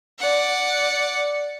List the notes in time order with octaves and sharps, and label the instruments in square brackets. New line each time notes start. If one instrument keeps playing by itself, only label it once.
[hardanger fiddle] D5 F#5